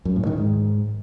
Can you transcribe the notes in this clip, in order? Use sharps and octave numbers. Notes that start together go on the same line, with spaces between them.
F#2
A2
D#3
G#2